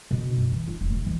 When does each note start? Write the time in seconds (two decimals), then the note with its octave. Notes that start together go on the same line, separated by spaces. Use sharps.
0.11 B2
0.38 F#2
0.51 E3
0.68 F4
0.81 E1
0.95 A#2
1.06 E3